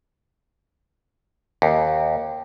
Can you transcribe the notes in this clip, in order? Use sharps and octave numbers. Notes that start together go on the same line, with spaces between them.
D#2